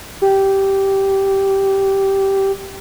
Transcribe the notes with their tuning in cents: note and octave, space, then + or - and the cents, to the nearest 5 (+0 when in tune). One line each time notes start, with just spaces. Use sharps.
G4 -10